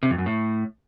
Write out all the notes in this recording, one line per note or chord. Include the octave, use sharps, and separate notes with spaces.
C3
F2
F#2
A2